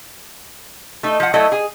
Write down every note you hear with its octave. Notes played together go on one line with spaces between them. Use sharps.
A3 D#4
F3 F#5
F#3 A3 E4 A4 D#5
G#4 G#5